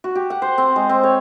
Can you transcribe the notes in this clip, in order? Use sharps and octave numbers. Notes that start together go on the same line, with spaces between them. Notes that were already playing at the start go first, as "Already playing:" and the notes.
F#4
G4
F#5
C5
C4
G#3
C4
C#5